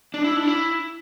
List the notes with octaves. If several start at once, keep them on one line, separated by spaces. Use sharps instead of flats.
D4
E4
D4
E4